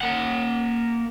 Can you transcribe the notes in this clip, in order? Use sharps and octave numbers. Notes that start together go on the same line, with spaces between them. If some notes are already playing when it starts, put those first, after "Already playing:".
A#3 F#5